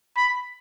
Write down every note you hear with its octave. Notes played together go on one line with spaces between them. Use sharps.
B5